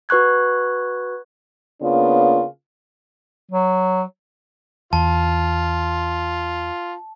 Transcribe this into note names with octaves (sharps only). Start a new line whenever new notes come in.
F#4 B4 C#6 F#6 G#6
C#3 A#3 B3 D4 F4
F#3
E2 F4 A5